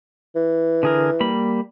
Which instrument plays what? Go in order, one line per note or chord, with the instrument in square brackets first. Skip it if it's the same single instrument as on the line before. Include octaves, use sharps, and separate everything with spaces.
[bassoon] E3
[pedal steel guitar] D3 G#4 A#4
G3 A#3 B5